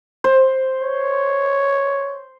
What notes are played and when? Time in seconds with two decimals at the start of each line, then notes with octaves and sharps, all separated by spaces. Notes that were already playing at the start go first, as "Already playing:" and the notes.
0.24 C5
0.82 C#5